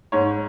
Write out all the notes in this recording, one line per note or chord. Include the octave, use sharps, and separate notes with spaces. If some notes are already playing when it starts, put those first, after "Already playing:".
G#2 C#5